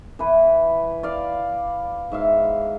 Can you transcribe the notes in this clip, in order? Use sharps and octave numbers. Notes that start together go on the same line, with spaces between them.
E3 B4
D5 F5
G#2 E5 F5